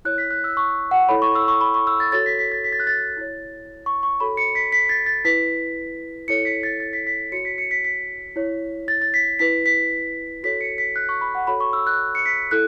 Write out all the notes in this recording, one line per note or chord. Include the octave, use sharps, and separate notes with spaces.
E4 C#5 F#6
B6
F#6
E6
C#6
F#5
E4 A4 C#5 B5
C#6
E6
C#6
B5
C#6
E6
A6
F#4 A4 C#5 A6
B6
B6
A6
B6
A6
F#6
A6
E4 C#5
C#6
C#6
F#4 A4 C#5 B5
C#7
B6
B6
A6
A6
E4 B4 B6
E4 A4 C#5 C#7
B6
A6
A6
B6
B6
F#4 C#5 C#7
B6
C#7
B6
B6
E4 C#5
A6
A6
B6
E4 B4 B6
B6
F#4 A4 C#5 B6
C#7
B6
F#6
C#6
B5
F#5
F#4 A4 C#5 B5
C#6
E6
F#6
C#7
B6
E4 A4 F#6